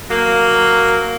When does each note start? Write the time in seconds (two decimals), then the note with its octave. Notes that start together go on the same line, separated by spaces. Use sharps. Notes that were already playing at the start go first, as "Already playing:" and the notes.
0.10 F#3 A#3